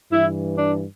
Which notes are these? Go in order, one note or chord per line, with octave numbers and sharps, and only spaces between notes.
G2 E3 E4
D4